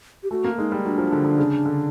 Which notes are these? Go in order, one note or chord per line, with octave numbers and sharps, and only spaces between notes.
G4
A3 F#4
A#3
G#3 D#4
G3
F#3 D4 D#4
F3
D3
D3
C#3
D3